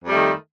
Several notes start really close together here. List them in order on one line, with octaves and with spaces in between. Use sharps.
F2 G3 A3 D#3